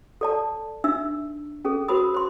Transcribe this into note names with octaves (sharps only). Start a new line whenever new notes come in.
A4 D5 A5
D4 D#4 E5 E6
C#4 G#4 A4
F#4 A#4 C5 B5 D#6
C5 C6